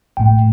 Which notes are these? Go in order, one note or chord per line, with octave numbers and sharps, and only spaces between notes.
A1 A2 A3 G5